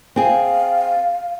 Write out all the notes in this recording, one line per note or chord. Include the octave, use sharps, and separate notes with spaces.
C4 G#4 F5